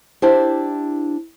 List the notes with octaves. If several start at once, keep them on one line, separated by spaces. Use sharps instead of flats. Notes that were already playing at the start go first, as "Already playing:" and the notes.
D4 E4 G4 C5